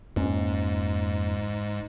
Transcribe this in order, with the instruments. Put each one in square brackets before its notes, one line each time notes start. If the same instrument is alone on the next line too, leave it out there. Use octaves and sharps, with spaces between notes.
[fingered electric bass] F2 A#3 C#4 [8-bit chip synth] G#2